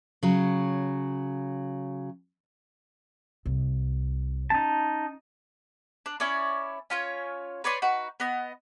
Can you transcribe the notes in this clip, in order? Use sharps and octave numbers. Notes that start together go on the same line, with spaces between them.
C#3 F#3
C2
C#4 D#4 A5
D4
C#4 E4 C#5 D5
C#4 F4 C#5
B4 C#5 D5 C6
D#4 F#4 B4
B3 D#5